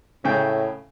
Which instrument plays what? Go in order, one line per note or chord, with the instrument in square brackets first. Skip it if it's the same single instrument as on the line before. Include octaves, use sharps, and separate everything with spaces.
[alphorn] A2 [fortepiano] C#3 G5